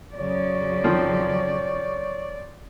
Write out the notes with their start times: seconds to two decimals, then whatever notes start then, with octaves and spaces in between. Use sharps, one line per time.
0.16 F2 C#3 F#3 C#5 D5
0.84 D#3 F3 C4